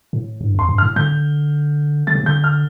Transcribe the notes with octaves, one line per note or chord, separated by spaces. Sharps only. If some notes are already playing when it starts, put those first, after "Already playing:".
A2
G2
F2 C6
G2
A2 F6
D3 G6
D3 A6
C3
D3 G6
F6